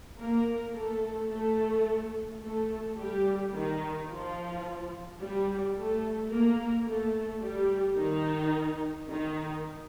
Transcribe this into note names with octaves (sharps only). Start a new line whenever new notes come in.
A#3 A#4
A3 A4
A3 A4
A3 A4
G3 G4
D#3 D#4
F3 F4
G3 G4
A3 A4
A#3 A#4
A3 A4
G3 G4
D#3 D#4
D#3 D#4